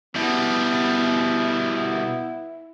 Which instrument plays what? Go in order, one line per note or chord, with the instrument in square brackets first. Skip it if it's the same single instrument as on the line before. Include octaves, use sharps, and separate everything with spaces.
[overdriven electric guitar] B2 G3 [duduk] B3 [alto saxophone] E4